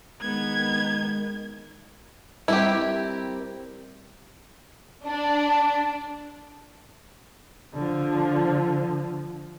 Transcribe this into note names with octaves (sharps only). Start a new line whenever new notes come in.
D#3 G#3 B3 G#6
G3 C4 E4 G4 A#4
D4
D3 F3